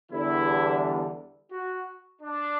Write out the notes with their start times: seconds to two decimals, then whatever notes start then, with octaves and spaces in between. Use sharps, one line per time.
0.11 E2 D3 G3 E4
1.52 F#4
2.22 D4